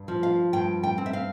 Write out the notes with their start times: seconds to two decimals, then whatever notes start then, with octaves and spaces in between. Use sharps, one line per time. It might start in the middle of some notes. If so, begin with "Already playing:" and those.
Already playing: G2
0.08 F3
0.23 F5
0.53 G2 G5
0.83 G5
0.98 C4
1.06 E5
1.13 F5